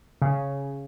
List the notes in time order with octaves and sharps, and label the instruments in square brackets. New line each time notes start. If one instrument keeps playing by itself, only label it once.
[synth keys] C#3